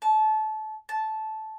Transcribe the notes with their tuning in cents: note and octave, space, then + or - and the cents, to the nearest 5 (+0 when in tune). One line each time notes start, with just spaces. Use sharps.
A5 -25
A5 -10